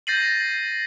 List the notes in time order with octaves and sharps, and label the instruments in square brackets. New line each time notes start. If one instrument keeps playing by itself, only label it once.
[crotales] G6 A6 A#6 C7 D#7 F#7